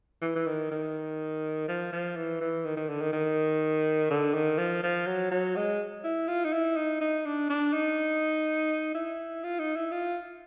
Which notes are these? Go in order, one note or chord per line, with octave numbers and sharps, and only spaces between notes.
E3
E3
D#3
D#3
F3
F3
E3
E3
D#3
D#3
D3
D#3
D#3
D3
D#3
F3
F3
F#3
F#3
G#3
E4
F4
D#4
E4
D#4
D#4
D4
D4
D#4
E4
F4
D#4
E4
F4